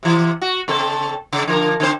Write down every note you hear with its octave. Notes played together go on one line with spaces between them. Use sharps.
C3 E3
F#4
C#3 C4 A4
C#3
D3 F3 A#4
D3 C4 C5